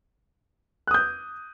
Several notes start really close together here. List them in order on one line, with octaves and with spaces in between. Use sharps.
F#6 D#6 G6